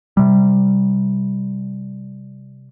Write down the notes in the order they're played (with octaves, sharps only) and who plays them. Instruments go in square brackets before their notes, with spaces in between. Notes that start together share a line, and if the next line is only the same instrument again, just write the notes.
[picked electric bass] C3 G3